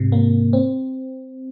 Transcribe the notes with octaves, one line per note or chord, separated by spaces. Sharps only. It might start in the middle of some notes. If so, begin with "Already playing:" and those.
Already playing: G#2 C3
A#3
C4